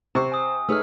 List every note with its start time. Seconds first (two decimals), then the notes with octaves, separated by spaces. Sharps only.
0.15 C3 C5 C#6
0.32 G#5 D#6
0.69 A3 D#4 G#4 B4 C#5 E6 F6